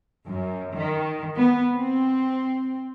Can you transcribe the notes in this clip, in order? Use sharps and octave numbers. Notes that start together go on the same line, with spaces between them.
F#2
D#3
B3
C4